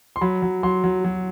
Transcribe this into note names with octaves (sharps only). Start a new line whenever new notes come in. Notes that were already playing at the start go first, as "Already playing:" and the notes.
C6
F#3 B5
F#3
F#3 C6
F#3
F#3